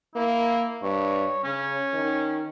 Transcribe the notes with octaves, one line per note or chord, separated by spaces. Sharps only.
A#3 E4
G2 C#5
C#3 C#4
D#3